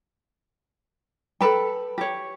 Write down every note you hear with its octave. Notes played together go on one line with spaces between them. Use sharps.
A4 B4 G5
G4 C#5